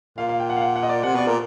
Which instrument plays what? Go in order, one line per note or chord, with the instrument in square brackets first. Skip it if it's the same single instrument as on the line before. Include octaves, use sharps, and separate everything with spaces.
[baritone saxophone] A#2 [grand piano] F5
[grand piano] F5
G5
F#5
F5
F#5
F#5
D#5
D5
[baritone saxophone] C3 [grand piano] F#5
[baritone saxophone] B2 [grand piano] D5
[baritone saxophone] A#2 [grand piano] A#4